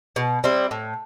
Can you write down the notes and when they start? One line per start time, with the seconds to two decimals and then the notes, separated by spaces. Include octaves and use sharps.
0.16 B2
0.44 G3 C4 E4
0.71 A2